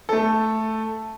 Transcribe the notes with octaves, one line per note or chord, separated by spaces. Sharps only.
A3 A4